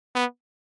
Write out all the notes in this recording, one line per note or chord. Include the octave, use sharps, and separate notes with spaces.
B3